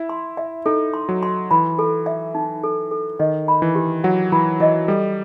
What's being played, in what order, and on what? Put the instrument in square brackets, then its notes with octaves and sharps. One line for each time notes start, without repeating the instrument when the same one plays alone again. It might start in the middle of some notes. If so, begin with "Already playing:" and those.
Already playing: [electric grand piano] E4 [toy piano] E5
[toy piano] C6
E5
[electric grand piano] D#4 [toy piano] A4
[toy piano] C6
[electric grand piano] F#3
[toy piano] C6
[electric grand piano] E3 [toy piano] B5
[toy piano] A4
E5
D#4
A4
A4
[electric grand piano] D#3 [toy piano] D#5
[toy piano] B5
[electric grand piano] E3
[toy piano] G4
[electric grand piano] F#3 [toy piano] F#5
[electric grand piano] E3 [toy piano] B5
[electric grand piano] E3 [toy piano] D#5
[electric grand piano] G3 [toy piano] A4